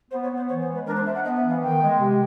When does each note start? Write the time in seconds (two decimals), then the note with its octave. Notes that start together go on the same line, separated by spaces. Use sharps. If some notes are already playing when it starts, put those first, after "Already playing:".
0.10 B3 C5
0.23 C#5
0.30 B3
0.36 C5
0.48 E3 C#5
0.61 C5
0.67 G#3
0.74 B4
0.86 D4 A#4
0.95 C5
1.05 D4 E5
1.14 F#5
1.24 B3 D#5
1.36 E5
1.43 E3
1.49 F5
1.61 D#3 G5
1.81 G#3
2.00 C3